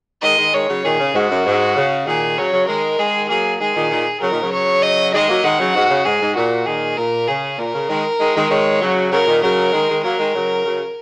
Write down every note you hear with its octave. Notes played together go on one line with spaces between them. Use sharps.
D#3 G#3 D#5
D#3 G#3
D#3 G#3 C#5
C#3 F#3
A#2 D#3 G#4
C#3
G#2 F#4
F#2
G#2
C#3
A#2 D#3 G#4
C#3 F#3 C#5
C#3 F#3
D#3 G#3 A#4
D#3 G#3 G#4
F#3 A#3 G#4
D#3 G#3 G#4
A#2 D#3
A#2 D#3
C#3 F#3 A#4
A#2 D#3
C#3 F#3
C#5
D#5
D#3 G#3 D#5
F#3 A#3
D#3 G#3 F#5
C#3 F#3
G#2 F#4
C#3
G#2 G#4
G#2
A#2 F#4
A#2 D#3 G#4
A#2 A#4
C#3 G#4
A#2 A#4
C#3
D#3 G#3
D#3 G#3
D#3 G#3
D#3 G#3 C#5
C#3 F#3
C#3 F#3 A#4
A#2 D#3
C#3 F#3 A#4
D#3 G#3
D#3 G#3
F#3 A#3 A#4
D#3 G#3
C#3 F#3
C#3 F#3